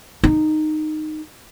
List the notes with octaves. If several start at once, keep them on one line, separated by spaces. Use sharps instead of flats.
D#4